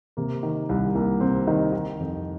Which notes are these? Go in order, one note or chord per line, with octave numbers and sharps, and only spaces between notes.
C3 A#3
D#3
C2
C2 A#3
C3 C4
D#3 D#4
D#3
F2